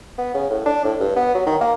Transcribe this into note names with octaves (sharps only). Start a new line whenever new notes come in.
B3
C#3
A2
D4
A2
G2
B3
F#3
D#3
A#3